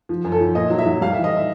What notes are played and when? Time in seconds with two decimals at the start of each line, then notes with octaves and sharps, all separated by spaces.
0.09 F3
0.24 F#2
0.32 A4
0.40 F3
0.55 A#2 D#5
0.70 F#3
0.78 E5
0.86 F#3
1.01 G3 F5
1.13 E3 E5
1.24 D#5
1.37 E5